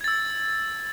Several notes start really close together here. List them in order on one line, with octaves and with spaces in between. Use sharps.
G#6 A6 E6